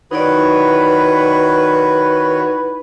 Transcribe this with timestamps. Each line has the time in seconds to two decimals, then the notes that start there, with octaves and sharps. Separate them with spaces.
0.11 D#3 D#4 E4 F#4 B4 C#5 D5